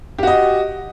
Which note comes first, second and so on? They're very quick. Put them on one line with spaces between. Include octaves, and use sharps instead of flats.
G4 F#4 D#5